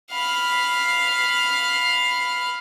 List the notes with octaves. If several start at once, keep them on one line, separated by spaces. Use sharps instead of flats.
F5 B5